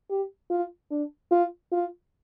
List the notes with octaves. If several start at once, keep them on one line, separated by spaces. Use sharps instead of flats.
G4
F4
D4
F4
F4